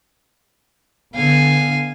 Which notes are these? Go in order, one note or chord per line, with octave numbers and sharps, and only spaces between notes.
D3 B3 F5 G#5